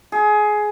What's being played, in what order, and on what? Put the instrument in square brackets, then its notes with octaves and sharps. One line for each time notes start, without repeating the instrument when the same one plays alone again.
[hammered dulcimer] G#4